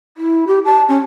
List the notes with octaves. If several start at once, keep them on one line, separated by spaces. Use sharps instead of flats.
E4
G4
A5
C#4